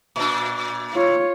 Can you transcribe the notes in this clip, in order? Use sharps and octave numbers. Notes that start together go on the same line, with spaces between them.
A#2 D4
F4 C#5